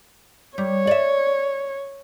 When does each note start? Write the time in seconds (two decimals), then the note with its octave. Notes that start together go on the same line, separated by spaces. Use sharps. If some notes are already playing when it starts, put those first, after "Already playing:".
0.58 G3 C#5
0.87 D5 E5